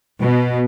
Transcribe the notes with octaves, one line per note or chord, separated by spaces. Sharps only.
B2